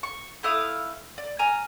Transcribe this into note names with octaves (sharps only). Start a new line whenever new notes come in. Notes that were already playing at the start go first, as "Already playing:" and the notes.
C#6
A3 E4 F5 D#6
D5
G#5 A#5 F6